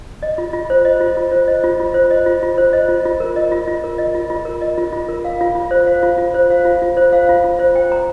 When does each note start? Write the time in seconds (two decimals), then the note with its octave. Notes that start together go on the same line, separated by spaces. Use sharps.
0.23 D#5
0.38 F4
0.53 F4
0.70 C5
0.85 D#5
1.01 F4
1.17 F4
1.31 C5
1.48 D#5
1.64 F4
1.80 F4
1.94 C5
2.11 D#5
2.26 F4
2.42 F4
2.58 C5
2.73 D#5
2.88 F4
3.05 F4
3.20 A#4
3.36 D#5
3.52 F4
3.68 F4
3.84 A#4
3.98 D#5
4.15 F4
4.30 F4
4.45 A#4
4.61 D#5
4.77 F4
4.92 F4
5.08 A#4
5.25 F5
5.41 F4
5.55 F4
5.71 C5
5.87 F5
6.03 F4
6.18 F4
6.34 C5
6.50 F5
6.65 F4
6.82 F4
6.97 C5
7.12 F5
7.29 F4
7.44 F4
7.59 C5
7.76 G5
7.92 A#5